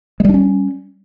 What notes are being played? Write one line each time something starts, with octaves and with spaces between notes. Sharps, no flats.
G3 G#3 C#4 D4